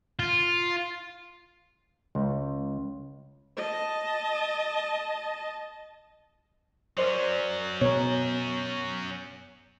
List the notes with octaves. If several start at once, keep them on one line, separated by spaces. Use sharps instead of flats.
F4
C#2
D#5 A5
F#3 C#4 A#4 C5 D5
B2 A#4 C#5